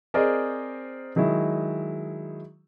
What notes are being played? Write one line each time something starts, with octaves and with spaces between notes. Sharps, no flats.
C4 G#4 A#4 C5 D5 D#5
D#3 F#3 G#3 E4